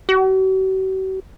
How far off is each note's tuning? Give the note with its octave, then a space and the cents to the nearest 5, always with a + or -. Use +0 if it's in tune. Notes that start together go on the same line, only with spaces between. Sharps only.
F#4 +45